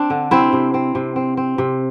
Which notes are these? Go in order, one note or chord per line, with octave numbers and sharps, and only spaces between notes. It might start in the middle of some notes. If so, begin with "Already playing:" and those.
Already playing: C4 D4
D3
C3 C4 E4
C3
C4
C3
C4
C4
C3